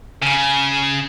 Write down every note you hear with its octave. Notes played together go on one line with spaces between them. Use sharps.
C#3